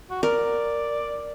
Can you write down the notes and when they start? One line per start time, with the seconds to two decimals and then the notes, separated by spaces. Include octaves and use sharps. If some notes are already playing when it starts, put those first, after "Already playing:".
0.10 F#4
0.23 A#4 D5